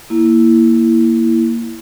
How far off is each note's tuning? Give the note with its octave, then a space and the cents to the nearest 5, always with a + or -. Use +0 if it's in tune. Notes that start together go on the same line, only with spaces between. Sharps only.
A#3 +0 E4 +0